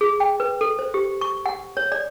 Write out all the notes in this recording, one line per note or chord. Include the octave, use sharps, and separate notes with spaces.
G#4
G5
B4
A4
C5
G4
C#6
F#5
C#5
D5